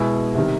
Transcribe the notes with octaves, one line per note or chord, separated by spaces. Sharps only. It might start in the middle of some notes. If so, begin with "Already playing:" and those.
Already playing: B2 G#3 B3 E4
C3 D#3 G3